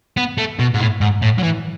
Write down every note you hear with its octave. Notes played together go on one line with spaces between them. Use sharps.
B3
A3
B2
G#2
A2
G#2
A2
F#3
E3